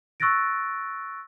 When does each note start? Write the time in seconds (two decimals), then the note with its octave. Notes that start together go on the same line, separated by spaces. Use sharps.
0.20 C#6 E6 F#6 A6 A#6 D7